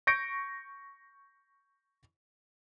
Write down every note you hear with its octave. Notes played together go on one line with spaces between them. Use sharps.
C#6 G6 A#6 C#7 D7